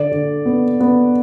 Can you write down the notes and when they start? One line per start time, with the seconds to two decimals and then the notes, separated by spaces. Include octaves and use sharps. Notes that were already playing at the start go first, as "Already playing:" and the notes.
Already playing: D3 D5
0.12 D3
0.46 B3
0.80 B3